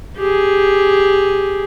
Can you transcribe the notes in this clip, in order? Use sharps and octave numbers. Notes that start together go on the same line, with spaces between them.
G4 G#4